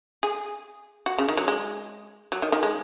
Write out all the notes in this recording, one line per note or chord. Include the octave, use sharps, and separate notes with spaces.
G#4
F#4
C#3
D#3
F#3
G#3
F#3
D#3
D#3
G#3